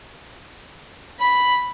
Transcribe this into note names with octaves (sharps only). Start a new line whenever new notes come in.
B5